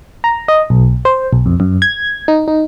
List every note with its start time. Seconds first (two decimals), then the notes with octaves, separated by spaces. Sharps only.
0.24 A#5
0.48 D#5
0.70 B1
1.05 C5
1.33 B1
1.46 F2
1.60 F#2
1.82 G#6
2.28 D#4
2.48 D#4